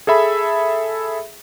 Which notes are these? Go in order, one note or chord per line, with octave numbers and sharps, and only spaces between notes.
G#4 A4 E5 B5